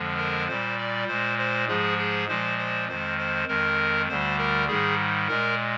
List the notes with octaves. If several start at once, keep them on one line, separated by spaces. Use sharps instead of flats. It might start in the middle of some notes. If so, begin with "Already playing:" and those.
Already playing: F2 D3 F3 G#3
A#4
A#2 G3 C5
D5
A#2 G#3 C5
C5
G#2 F3 G#3 G#4
G#4
A#2 F3 G#3 C5
C5
F2 D#3 G#3 C5
C5
F2 D#3 G#3 A#4
D2 D3 G3 C5
A#4
G#2 D#3 G3 G#4
A#2 G#3 A#4